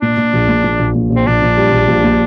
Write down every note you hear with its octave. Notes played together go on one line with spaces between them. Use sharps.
A#2 D4
A#2
A#1
A#2
A#2
A#1
A#1
A#1
C4
A#1 D4
A#1
G3
A#1
A#1
A#2